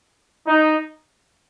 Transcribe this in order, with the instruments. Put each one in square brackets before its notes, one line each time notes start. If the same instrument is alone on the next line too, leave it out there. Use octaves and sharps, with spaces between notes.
[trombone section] D#4